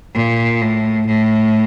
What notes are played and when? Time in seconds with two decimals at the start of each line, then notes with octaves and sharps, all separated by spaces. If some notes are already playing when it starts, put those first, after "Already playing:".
0.14 A#2
0.61 A2
1.07 A2